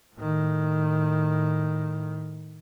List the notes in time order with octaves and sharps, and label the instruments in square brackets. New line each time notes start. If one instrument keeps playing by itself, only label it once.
[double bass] A2 D#3